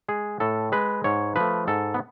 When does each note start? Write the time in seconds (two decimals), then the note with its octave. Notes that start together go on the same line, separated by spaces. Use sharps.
0.08 G#3 G#4
0.40 A2 A4
0.72 G#3 B4
1.04 G#2 C#5
1.36 F3 A3 B4
1.67 G#2 A4
1.94 B3